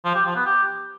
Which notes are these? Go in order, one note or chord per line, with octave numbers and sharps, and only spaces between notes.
F3
G4
F3
B3
G4